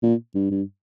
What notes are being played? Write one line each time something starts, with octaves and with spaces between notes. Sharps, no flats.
A#2
G2
G2